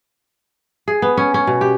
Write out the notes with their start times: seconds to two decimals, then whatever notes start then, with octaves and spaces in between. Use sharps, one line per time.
0.88 G#4
1.02 B3
1.17 C#4
1.34 C#4
1.47 B2
1.61 G4